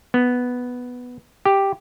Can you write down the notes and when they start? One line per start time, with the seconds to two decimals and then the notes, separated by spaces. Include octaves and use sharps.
0.14 B3
1.45 G4